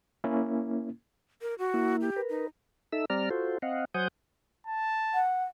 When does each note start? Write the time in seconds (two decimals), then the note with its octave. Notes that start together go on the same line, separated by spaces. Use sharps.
0.24 A#3 C#4 E4
1.42 A#4
1.59 F#4
1.74 A#3 E4
2.01 G4
2.16 A#4 B4
2.30 D#4
2.92 D#4 A4 E5 E6
3.10 G3 C4 D5 A#5 F6
3.30 F4 F#4 A4 C5
3.62 C4 D#5 F5 F#5
3.94 F#3 C5 F#5 G#5 D#6 G6
4.67 A5
5.14 F#5